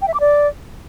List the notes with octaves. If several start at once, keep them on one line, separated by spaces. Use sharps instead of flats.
G5
E5
D6
D5